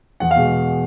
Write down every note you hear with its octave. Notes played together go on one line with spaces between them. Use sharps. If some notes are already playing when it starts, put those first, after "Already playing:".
E2 F#5
F5
B2 G#3